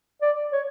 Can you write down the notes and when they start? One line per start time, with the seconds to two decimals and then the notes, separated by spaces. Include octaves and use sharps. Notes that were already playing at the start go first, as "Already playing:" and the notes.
0.22 D5
0.52 C#5